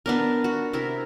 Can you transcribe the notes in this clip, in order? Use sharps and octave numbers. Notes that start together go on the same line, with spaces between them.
B3 D4 A#4
F#4
C3 E4 A#4